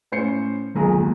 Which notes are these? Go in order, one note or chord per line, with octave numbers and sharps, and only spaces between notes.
A2 C#4 C5 C7 C#7
D#1 B1 G#4 A#5
D#2